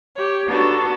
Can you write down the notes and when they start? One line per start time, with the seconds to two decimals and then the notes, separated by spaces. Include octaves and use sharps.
0.16 G4 C#5
0.46 B3 D4 D#4 F#4 A4